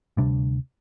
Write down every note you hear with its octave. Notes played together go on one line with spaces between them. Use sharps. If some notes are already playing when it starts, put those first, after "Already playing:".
D2 C3 G3 D4